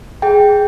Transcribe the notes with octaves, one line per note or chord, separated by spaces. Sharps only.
G#4 G5